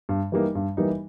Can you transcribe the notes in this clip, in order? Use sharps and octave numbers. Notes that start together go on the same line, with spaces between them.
G2
E3 G3 A#3 D#4
G2
E3 G3 A#3 D#4